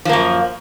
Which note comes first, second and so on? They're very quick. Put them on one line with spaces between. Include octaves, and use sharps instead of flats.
F3 A#3 F#2